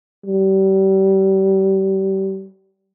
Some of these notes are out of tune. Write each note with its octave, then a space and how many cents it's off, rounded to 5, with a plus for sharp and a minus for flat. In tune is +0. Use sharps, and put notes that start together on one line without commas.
G3 -30